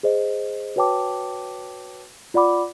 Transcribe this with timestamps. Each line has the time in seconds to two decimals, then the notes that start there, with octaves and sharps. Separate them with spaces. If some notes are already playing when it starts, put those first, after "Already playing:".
0.03 G#4 C5 D#5
0.76 F#4 B4 C#5 G5 A5 D6
2.34 F4 D5 F#5 B5 D6